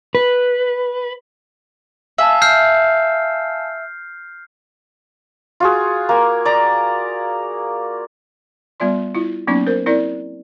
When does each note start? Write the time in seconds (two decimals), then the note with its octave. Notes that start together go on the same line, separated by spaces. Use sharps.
0.15 B4
2.18 E5 F5 G#5 A5
2.42 F6 G6 C7
5.60 F4 F#4 G#4
6.09 A#3 G#5
6.45 D5 A#5
8.80 G3 B3 F4 D5 C6
9.15 E4 F4
9.47 F#3 A#3 B3 C#4 D#4
9.66 A#4 C5
9.86 C4 E4 A#4 D5